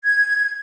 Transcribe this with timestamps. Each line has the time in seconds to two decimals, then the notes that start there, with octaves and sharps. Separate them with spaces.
0.04 G#6